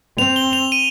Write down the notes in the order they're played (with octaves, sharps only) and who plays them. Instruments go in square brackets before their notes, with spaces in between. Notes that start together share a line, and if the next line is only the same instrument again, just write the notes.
[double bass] C4 [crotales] F7
[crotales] G7
F7
D#7